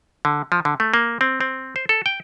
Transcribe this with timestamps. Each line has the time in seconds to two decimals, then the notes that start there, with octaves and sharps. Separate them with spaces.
0.25 D3
0.52 F3
0.65 D3
0.80 A3
0.94 A#3
1.21 C4
1.41 C4
1.76 C5
1.89 A4
2.06 G5